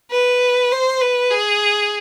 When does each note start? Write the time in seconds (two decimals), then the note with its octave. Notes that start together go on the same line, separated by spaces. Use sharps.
0.11 B4
0.72 C5
1.01 B4
1.31 G#4